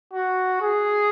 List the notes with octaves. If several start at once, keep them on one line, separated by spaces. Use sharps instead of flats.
F#4
G#4